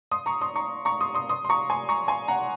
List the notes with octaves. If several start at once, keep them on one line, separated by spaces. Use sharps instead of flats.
C6 D#6
A#5 C#6
C6 D#6
A#5 C#6
A#5 C#6
C6 D#6
C6 D#6
C6 D#6
C6
A#5 C#6
G#5 C6
A#5 C#6
G#5 C6
F#5 A#5